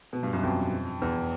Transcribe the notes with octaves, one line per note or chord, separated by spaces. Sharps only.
B2
G2
F#2
F2
E2